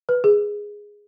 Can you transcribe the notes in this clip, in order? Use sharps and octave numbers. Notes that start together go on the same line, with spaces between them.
B4
G#4